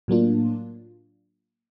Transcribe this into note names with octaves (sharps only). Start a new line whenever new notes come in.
A2 F#3 A#3 D4 F4